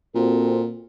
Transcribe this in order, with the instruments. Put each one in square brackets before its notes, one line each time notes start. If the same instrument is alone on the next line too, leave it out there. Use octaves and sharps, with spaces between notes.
[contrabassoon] A#2 [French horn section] C4 F#4 A4